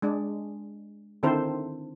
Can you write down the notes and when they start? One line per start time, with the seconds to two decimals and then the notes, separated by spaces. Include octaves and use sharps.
0.02 G#3 D4
1.23 D3 D#3 C4 E4 A4 C5